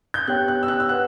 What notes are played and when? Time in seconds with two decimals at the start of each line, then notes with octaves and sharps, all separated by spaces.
0.14 G6
0.28 B3 D4 G4 C#5 G5 F#6
0.48 F#6
0.63 E6
0.68 F#6
0.80 E6
0.89 B4 F#5 F#6